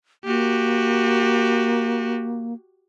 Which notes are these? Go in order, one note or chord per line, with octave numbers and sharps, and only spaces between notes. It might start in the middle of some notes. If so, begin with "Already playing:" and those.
A#3 F#4 G4